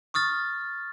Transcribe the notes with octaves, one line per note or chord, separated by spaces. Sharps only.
C#6 D#6 F6 A6